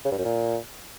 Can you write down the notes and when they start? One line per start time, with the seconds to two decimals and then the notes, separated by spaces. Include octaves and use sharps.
0.05 C#3
0.11 G2
0.18 F#2
0.25 A#2